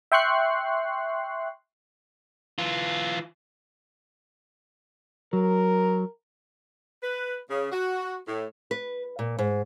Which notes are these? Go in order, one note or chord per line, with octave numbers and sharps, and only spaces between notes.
E5 G5 C6 C#6 F#6 C7
E3 F4
F#3 A#4
B4
C#3
F#4
A2
B4
A#2
G#2